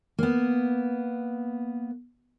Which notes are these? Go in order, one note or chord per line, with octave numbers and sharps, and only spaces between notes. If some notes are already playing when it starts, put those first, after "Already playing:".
A#3 B3